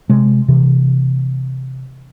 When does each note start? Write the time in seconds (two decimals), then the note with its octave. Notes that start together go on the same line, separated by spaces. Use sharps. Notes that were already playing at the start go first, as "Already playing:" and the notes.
0.10 C3 G#3
0.48 C3 E3